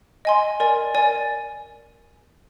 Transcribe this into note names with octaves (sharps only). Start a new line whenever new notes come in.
D#5 G#5 C6
A#4 D5 G#5
A#4 D5 G#5